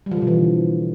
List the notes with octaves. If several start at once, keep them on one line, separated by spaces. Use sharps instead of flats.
G3
F3
D3
B2
E3